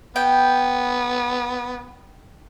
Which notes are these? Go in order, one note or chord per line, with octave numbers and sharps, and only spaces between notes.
B3 G5